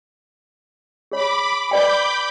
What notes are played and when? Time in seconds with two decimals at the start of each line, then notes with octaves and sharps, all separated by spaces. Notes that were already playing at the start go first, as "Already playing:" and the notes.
1.12 G#4 C#5 B5 D6
1.71 B4 D5 G5 B5 D6 G6